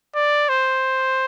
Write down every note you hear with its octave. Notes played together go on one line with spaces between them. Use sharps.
D5
C5